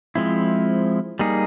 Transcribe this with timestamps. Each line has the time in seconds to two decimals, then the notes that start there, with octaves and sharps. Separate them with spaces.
0.15 F3 G#3 C4 E4
1.19 G3 A#3 D#4 G#4